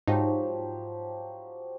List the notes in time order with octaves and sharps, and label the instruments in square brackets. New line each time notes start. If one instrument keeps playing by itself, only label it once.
[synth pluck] G#2 D#4 [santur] F3 F#3 G4